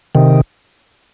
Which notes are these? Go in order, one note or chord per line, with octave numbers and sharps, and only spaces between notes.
C3 D#3